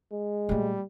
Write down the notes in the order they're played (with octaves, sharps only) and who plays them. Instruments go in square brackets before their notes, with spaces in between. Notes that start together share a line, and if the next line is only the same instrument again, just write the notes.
[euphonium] G#3
[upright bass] A#2 A3 [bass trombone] G3